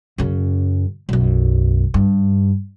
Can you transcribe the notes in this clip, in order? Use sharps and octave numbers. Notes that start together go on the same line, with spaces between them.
F#2 C#3
B1 F#2
G2